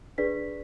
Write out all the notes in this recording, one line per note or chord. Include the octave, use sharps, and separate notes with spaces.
D4 G#4 B4 D5 B6